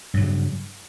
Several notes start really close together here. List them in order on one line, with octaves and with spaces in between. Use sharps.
G2 F#3 C#3